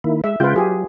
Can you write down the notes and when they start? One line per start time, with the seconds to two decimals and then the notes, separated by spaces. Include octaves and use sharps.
0.04 D#3 A#3 E4
0.24 G#3 E5
0.40 C#3 G#3 F4 B4 G5
0.56 F#3 G4 G#4